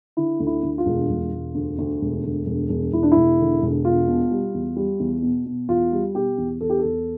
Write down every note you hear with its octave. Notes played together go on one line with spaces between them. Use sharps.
D3 E4
D2
E4
D2
F4
E1
E1
E1
D2
D2
E1
D2
E1
E1
E1 E4
D4
E1 E4
D3
E1
B2 F4
B2
G3
E2
G3
E2
B2
B2
E2 F4
G3
B2 G4
E2
E2 A4
G4
A4
E2